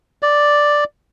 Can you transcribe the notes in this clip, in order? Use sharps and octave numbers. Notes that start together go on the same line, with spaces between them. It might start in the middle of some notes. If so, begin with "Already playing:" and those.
D5